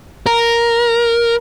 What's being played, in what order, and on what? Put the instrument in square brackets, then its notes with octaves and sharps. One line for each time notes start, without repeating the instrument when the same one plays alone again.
[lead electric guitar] A#4